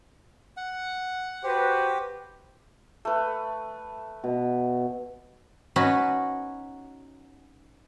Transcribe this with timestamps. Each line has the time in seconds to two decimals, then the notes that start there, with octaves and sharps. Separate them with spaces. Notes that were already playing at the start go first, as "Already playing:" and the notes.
0.57 F#5
1.44 F#4 G4 B4 C5
3.05 A3 B4
4.24 B2
5.76 C#4 D#4 F#4 B4